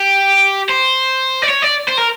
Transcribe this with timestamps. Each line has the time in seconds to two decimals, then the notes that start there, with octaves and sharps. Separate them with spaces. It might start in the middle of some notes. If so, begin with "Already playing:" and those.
Already playing: G4
0.69 C5
1.42 D5
1.49 C#5
1.62 D5
1.88 C5
1.97 A#4